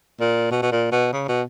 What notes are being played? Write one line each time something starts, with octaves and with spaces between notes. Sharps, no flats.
A#2
B2
B2
A#2
B2
C#3
B2